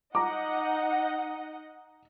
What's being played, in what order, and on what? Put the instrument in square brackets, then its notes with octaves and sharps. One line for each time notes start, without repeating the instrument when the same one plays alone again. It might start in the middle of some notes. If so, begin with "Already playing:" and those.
[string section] D#4 D#5 F#5 [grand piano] A#5 D6